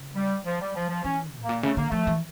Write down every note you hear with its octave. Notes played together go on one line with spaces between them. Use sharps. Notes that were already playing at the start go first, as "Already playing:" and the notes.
Already playing: C#3
G3
F3
G3
F3
F3
E3 C#4
A2
A#3
A#2
C#3 A3
D3 A#3
F3 A3
E3